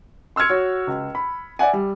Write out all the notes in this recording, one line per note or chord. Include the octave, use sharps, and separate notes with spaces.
C6 E6 F6 G#6 C#7
F#4 C#5
C#2
B5
D5 E5 F#5 G#5
G3